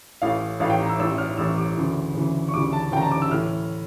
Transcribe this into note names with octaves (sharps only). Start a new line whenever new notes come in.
A1 A2 E3 F5
A1 A2 E3 F5
G5
A#5
E6
A1 A2 E3 E6
F6
A1 A2 E3 E6
D6
D2 C#3 E3
D2 C#3 E3
C#6
D2 C#3 E3 D6
A5
D2 C#3 E3 G5 A#5
A5
D6
E6
A2 E3 F6